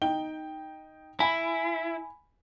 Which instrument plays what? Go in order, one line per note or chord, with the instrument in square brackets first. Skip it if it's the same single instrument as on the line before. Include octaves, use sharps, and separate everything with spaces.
[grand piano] D#4 G5 G7
[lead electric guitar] E4 [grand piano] G#5 B5